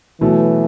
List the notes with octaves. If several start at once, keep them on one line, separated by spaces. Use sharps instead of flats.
B2 E3 F#3 A3